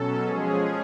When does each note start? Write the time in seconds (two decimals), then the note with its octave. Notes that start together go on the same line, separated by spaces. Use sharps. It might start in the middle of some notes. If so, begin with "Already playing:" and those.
Already playing: B2 F#3 C#4 A4
0.23 F3 G#3 C#4 G#4